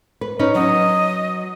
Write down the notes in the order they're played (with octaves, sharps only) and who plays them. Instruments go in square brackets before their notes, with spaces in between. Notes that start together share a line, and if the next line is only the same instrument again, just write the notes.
[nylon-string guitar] B4
C#4 D#4 B4
[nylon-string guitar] F#3 [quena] D#5